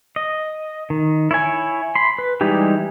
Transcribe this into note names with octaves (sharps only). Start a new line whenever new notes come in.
D#5
D#3
E4 C#5 G#5
B5 C6
B4
E3 G3 G#3 D#4 G4